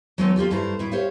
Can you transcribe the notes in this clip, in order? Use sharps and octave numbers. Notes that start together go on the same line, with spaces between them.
F#3 G#3 A3 B3 C4 D#4
A#3 F4 G4 A4
G2 A3 E4 C5 A#5
A2 E4
G4 C5 C#5 E5 F5